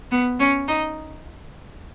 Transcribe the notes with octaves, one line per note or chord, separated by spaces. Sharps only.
B3
C#4
D#4